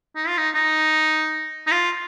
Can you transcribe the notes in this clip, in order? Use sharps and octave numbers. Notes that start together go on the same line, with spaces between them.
D#4
F4
D#4
D#4
D#4
F4